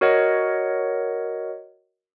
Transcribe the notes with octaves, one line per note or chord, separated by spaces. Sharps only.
F#4 A#4 C#5 D#5 F#5